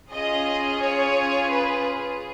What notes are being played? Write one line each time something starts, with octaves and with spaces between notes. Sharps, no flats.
C#4 F4 G#4 D#5
C#5
B4